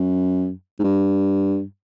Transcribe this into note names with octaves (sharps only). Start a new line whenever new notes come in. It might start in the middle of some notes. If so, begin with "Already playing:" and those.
Already playing: F#2
G#2
G2